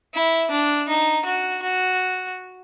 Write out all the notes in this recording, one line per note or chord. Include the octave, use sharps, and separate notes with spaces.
E4
D4
D#4
F#4
F#4